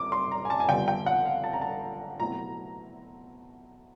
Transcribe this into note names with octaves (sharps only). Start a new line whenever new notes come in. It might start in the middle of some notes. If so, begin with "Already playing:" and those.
Already playing: D6
C6
A#5
G#5
A5
G#5
F2 D3 G3 B3 G5
G5
F#5
F5
A5
A#5
A5
B2 F#3 A3 C4 E4 A#5